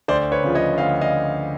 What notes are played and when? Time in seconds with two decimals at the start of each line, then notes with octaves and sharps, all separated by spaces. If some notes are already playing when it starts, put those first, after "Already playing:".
0.08 D2 C5 D5
0.31 B4 C#5
0.44 C#3 F3
0.55 C#5 D#5
0.78 D2 D#5 F5
1.01 D#5 F5